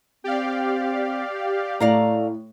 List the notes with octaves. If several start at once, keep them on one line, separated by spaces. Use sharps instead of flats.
C4 G4 D5 F5
A2 A3 D5 F5 A#5